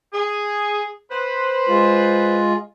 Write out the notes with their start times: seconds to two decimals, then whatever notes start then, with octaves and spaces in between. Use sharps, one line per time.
0.13 G#4
1.11 B4 C5
1.69 G#3 F4